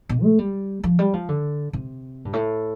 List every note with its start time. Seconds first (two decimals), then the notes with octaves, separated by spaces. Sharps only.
0.09 B2
0.23 A3
0.39 G3
0.84 F3
0.99 G3
1.13 F3
1.29 D3
1.73 C3
2.25 G2
2.33 A2